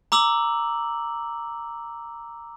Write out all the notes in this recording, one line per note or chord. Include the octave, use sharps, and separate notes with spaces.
A#5 D6 E6 F#7